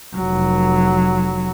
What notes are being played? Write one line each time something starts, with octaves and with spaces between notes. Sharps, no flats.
F1 F#3